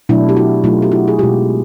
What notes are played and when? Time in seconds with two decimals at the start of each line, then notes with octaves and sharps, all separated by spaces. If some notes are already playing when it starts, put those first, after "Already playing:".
0.09 B2 F#3 A3 D4 E4
0.29 G4
0.36 E4 F#4
0.64 B2 F#3 A3 D#4 F4
0.82 G4
0.92 E4 F#4
1.08 G#4
1.19 B2 G#3 F4 G4